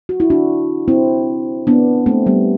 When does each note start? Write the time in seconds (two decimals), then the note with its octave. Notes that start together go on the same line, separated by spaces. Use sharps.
0.09 F#4
0.20 E4
0.30 D4 F#4
0.88 C4 E4
1.67 B3 D4
2.06 A3 C4
2.26 G3 B3